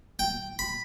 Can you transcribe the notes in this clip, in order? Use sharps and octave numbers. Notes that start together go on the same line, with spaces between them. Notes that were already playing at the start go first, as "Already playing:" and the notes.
G5
B5